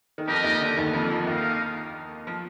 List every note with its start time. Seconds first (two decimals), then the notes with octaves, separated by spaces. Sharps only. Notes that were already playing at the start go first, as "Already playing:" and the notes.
0.18 D#3
0.27 F2 F3 D4 G4 A#4 D#5
0.44 D#2 D#3
0.61 D3
0.77 D#2 D#3
0.94 F2 F3
1.10 F2 F3
1.27 D#2 D#3 D#4 A#4 F5
2.27 F3